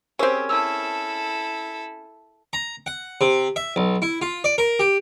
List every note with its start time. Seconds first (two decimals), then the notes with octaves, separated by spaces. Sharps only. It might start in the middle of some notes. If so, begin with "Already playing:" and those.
0.19 C4 C#4 G4 G#4 A#4
0.49 E4 A4 A5 E6
2.53 A#5
2.86 F#5
3.21 C3
3.56 E5
3.76 B1
4.02 E4
4.22 F4
4.44 D5
4.58 A#4
4.80 G4